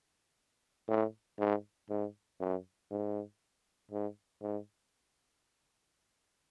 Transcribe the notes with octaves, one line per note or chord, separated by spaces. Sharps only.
A2
G#2
G#2
F#2
G#2
G#2
G#2